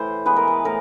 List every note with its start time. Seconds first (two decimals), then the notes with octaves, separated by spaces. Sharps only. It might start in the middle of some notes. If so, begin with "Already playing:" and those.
Already playing: A2 E3 C5
0.26 E3 G#3 B3 B4
0.36 A#4
0.47 B4
0.65 A2 A#4